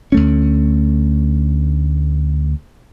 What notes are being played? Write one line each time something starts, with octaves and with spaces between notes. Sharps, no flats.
D2 A3 C#4